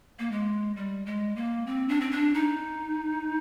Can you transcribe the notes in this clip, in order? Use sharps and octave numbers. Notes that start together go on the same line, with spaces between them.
A#3
G#3
G3
G#3
A#3
C4
D4
C4
D4
D#4